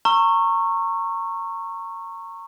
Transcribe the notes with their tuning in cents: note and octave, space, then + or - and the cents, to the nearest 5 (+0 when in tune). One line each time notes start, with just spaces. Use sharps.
A#5 -25 C#6 -15 E6 +30